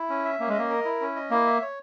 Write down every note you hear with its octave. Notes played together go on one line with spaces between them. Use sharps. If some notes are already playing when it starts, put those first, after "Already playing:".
Already playing: E4
C#4
E5
A#3 C#4
G#3
A#3 D#5
A#4
E4
C#4
D#5
A#3 E4
E5
C#5